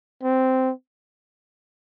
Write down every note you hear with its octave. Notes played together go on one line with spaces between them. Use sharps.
C4